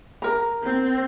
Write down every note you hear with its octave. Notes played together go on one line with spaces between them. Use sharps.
A#4 A#5
C4